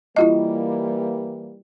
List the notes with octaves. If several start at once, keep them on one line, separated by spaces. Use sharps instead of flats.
E3 G3 A#3 E4 F4 D#5